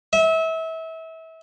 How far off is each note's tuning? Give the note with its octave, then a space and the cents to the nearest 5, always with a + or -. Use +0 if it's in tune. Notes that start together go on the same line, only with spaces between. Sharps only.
E5 -30